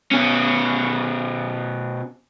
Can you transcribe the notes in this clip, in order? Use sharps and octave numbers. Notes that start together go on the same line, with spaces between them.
B2 C#4